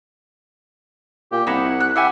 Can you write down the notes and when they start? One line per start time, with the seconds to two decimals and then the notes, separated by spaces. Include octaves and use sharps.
1.32 A#2 G4
1.47 C2 D#4 E4 F#5
1.80 F#6
1.96 E4 G4 E5 F#5 G#5